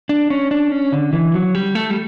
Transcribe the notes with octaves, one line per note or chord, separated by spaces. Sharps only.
D4
C#4
D4
C#4
D3
E3
F#3
G3
A3
G3